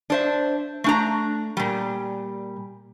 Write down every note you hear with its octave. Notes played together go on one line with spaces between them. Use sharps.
D4 C5 E5
A3 D4 A#5
A#2 G3